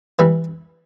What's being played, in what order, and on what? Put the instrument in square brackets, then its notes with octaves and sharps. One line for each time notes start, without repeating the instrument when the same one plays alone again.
[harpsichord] E3 G3